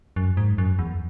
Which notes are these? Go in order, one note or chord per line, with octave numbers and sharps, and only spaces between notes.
F#2
G#2
F#2
E2